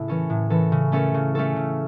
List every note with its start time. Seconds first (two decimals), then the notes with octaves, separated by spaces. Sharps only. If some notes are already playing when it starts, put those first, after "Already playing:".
Already playing: A2 C#3 A3 E4
0.08 E3 C#4 A4
0.30 A2
0.50 E3 C#4 A4
0.72 C#3
0.92 A3 C#4 A4
1.14 C#3
1.35 A3 C#4 A4
1.56 C#3